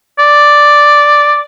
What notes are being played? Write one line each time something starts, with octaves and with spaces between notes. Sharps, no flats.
D5